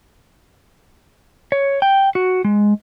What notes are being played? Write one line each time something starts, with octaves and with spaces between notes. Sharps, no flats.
C#5
G5
F#4
G#3